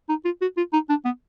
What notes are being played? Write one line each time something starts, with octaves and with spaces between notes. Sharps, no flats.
D#4
F4
F#4
F4
D#4
D4
B3